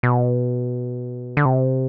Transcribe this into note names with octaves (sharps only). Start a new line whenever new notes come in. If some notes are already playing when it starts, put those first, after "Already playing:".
B2
D3
C3